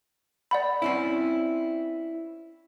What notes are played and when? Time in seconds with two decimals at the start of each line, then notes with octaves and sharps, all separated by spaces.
0.51 D5 F#5 B5
0.82 C4 C#4 E4